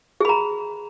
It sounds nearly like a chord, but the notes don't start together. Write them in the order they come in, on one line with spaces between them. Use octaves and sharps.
G#4 B5 A#5